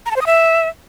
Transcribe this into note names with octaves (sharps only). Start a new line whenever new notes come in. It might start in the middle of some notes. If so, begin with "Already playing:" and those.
A#5
A5
C5
D#6
E5